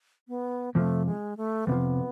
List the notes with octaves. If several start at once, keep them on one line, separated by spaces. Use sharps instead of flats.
B3
F2 C3 F3 A3
G#3
A3
F2 C3 F3 B3